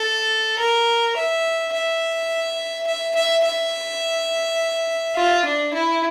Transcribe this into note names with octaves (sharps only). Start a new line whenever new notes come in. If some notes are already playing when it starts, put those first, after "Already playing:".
Already playing: A4
A#4
E5
E5
E5
E5
E5
F4
D4
E4